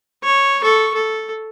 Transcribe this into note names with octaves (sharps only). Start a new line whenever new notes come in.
C#5
A4 C#6
A4